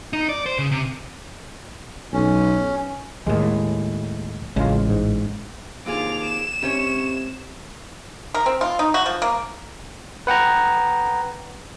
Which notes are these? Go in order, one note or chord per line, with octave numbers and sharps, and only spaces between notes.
D#4
D5
C5
C#3
C3
B1 C#4
D#2 A2 G#3 G#4
A1 C#3 G#3 F4
G#2
D#2 C4 F4 G#4 D6 F7
E7
G#2 C3 C#4 C#5
A#4
C4
F4
D#4
F#4
F3
A#3
B4 F#5 G5 A#5